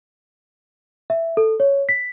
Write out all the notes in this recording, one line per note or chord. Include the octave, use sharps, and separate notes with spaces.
E5
A4
C#5
B6